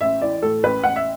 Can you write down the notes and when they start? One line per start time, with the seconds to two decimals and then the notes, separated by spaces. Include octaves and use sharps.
0.01 A1 E5
0.22 E3 D5
0.42 A2 A4
0.63 A1 B4
0.84 A1 F#5
0.96 E5